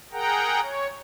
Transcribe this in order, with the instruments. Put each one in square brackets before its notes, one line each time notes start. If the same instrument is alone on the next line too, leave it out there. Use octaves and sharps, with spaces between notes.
[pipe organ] G#4 A#4 F#5 G5 A#5
C#5